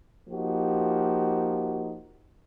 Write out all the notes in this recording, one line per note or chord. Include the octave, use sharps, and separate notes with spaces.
F3 A#3 D#4 F#4 G4